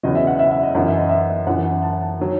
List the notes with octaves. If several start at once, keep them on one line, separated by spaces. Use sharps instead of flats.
E2 C#3 F#3 D#5
E5
F#5
E5
E5
D#5
F#2 E3 F#5
E5
D#5
E5
F#2 E3 F#5
A5
D#3 F#3